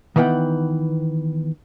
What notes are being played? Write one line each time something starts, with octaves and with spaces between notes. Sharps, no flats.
D#3 E3 B3 F#5 G5